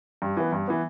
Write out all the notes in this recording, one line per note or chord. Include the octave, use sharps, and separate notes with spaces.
G2
E3 B3
G2
E3 B3